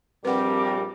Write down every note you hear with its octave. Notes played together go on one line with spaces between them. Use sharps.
A#1 G3 C4 G4 A#4 B4 F#5 D6